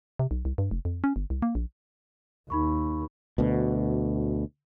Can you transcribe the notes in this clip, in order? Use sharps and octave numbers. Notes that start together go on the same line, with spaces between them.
C3
B1
C2
G2
F1
F2
C#4
G1
C2
A#3
A#1
D#2 D#4 B5 C#6
D2 B2